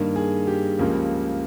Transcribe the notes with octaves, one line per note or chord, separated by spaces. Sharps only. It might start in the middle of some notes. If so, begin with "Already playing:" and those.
Already playing: G2 D#3 A#3
G#4
G4
C#2 C#3 F3 A#3